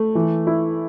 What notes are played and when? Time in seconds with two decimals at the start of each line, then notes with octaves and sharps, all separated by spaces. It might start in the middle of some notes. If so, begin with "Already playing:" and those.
Already playing: A3
0.15 E3
0.47 E4